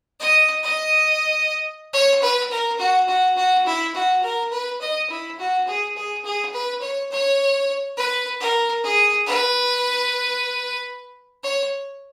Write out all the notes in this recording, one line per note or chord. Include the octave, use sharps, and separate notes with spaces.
D#5
D#5
C#5
B4
A#4
F#4
F#4
F#4
E4
F#4
A#4
B4
D#5
E4
F#4
G#4
G#4
G#4
B4
C#5
C#5
B4
A#4
G#4
B4
C#5